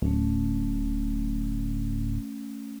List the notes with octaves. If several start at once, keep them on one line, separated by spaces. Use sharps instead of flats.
D1 A3 C#4